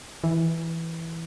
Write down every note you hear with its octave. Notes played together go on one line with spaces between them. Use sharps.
E3